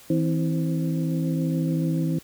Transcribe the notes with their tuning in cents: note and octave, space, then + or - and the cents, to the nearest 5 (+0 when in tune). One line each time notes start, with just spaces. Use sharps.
E3 -30 C4 +0